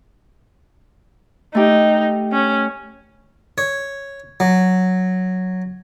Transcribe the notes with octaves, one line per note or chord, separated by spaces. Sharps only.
A3 D#4 G4
C#4
C#5
F#3